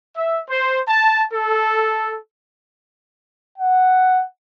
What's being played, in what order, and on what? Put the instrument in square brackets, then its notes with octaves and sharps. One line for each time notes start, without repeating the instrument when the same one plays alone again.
[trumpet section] E5
C5
A5
A4
[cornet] F#5